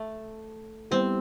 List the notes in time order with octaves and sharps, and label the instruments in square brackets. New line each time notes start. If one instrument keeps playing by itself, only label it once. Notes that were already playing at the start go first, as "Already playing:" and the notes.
Already playing: [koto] A3
[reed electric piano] G3 B3 E4 G4 [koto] C4